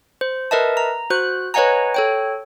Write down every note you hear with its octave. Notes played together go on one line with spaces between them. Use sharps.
C5
A#4 B4 D#5 E5 A5
A#5
F#4 C5 F#6
B4 C#5 D#5 F#5 G#5 A#5
A4 C#5 G5